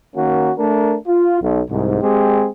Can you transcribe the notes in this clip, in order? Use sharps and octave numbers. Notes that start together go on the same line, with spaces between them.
D#3 A#3 C#4 F#4
A3 D4 A#4
F4
B1
C2 G#2
G#3 C4 G4 G#4